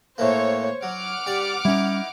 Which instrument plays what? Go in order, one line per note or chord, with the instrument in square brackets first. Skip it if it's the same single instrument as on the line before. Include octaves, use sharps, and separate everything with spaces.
[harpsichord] A2 E3 A#3 [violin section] C5 C#5
[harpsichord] F#3 [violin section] F#5 D6 F6
[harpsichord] G3 D5
[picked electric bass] G3 C#4 [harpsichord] D#4 E4